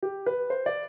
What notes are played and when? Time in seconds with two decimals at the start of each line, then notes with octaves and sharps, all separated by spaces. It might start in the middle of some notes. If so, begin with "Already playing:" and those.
0.03 G4
0.26 B4
0.50 C5
0.66 D5